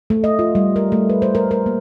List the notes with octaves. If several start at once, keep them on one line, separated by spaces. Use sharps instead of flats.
A3
D#5
F4
G3
A#4
A3
B4
C5
A#4
A#4
A#3